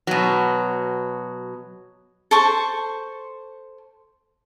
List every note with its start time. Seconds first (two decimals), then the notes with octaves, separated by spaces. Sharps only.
0.07 B2 F#3
2.31 A4 C5 C#6